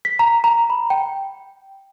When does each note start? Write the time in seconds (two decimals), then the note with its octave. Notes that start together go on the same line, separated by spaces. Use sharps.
0.05 B6
0.19 A#5
0.44 A#5
0.70 B5
0.90 G5